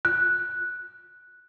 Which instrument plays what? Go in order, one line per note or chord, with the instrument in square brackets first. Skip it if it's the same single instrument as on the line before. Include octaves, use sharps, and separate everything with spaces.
[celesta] F#6